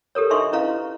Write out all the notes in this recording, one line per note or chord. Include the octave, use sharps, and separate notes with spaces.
G4 A4 A#4 C#5
D4 D#4 D#5 E5 C6 C#6
C#4 E4 B4 D#5 F5 A#5